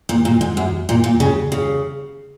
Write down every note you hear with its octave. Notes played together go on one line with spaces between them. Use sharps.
A#2
A#2
G#2
F#2
A#2
A#2
C#3
C#3